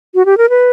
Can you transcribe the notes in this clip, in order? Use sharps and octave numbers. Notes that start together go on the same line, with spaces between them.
F#4
G4
A#4
B4